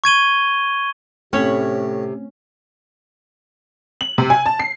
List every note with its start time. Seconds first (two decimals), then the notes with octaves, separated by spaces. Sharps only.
0.04 C#6 G#6 D#7 G7
1.33 A2 C3 A3 C4 C#4 C#5 B5
4.01 F#7
4.18 C3
4.30 G#5
4.46 A5
4.60 C7